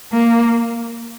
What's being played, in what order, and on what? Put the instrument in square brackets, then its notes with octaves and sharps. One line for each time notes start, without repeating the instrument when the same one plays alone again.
[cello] A#3